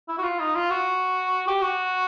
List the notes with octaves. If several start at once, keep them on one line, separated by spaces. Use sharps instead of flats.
E4
F#4
F4
D#4
F4
F#4
G4
F#4